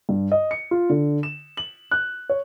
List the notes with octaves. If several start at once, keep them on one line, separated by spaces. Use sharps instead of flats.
G2
D#5
C#7
F4
D3
E7
F#7
F#6
C#5